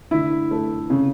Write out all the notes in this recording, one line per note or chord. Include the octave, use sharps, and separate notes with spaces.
D3 E4
A3
C#3